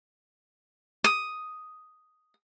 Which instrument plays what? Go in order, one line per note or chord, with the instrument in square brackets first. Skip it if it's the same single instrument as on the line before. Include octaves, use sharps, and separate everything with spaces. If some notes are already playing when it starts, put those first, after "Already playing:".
[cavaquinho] D#6